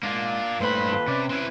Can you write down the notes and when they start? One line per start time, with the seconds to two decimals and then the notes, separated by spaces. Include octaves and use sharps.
0.03 G#2 A#3 D4 F4
0.60 G2 A#2 A3 B4 C5 B5
0.92 D#2 F4 A4
1.08 C3 C#4 D5
1.30 C4 E4 B4